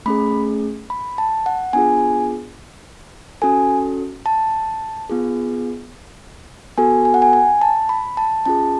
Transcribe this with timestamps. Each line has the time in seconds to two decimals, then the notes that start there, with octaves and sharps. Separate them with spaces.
0.06 A3 C#4 G#4 B5
0.90 B5
1.18 A5
1.46 F#5
1.73 B3 D4 F4 G#4 G#5
3.42 C#4 F#4 A4 G#5
4.26 A5
5.10 B3 F4 G#4
6.77 B3 F#4 A4 G#5
7.05 G#5
7.14 F#5
7.22 G#5
7.33 G#5
7.61 A5
7.89 B5
8.17 A5
8.46 C#4 F4 G#4 A5